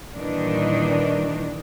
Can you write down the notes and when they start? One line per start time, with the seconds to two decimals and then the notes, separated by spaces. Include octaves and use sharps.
0.16 A#2 D#3 E3 G3 D4 D#4